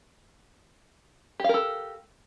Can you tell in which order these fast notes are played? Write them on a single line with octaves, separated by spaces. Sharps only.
G4 F5 A#4 A4